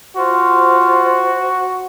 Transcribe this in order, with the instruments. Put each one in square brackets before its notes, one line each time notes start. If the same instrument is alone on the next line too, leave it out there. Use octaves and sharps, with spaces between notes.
[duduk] F4 [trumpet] F#4 [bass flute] C5